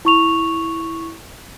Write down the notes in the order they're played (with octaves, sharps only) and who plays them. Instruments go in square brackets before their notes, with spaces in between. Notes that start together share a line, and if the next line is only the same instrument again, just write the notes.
[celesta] E4 C#6 F7